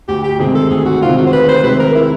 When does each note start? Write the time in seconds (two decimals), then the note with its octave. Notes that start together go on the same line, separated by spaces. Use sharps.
0.08 D2 G4
0.24 G4
0.39 C3 D#3 G#3 C4 G#4
0.55 A4
0.70 D2 G#4
0.85 F#4
1.01 C3 D#3 G#3 C4 F4
1.17 F#4
1.27 C5
1.32 D2 B4
1.48 C5
1.63 C3 D#3 G#3 C4 B4
1.80 A#4
1.95 E4